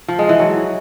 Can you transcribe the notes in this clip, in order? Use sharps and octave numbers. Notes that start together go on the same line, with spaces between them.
F3
G#3
E3
F#3